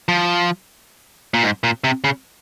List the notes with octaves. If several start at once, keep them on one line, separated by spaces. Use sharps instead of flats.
F3
A#2
G#2
A#2
C3
C#3